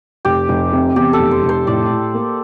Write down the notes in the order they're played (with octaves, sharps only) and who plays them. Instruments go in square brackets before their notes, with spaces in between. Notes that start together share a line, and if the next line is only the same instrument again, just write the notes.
[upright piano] F1 [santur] G4
[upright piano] F1
C3
[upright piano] E2 [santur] G4
[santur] A4
[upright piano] F1
[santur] C5
[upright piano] F1
[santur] C5
[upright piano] A2 [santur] D5
[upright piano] A2
A#3